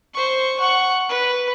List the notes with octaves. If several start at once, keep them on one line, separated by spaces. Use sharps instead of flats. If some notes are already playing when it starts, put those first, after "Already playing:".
C5 C#6
F#5 C#6
B4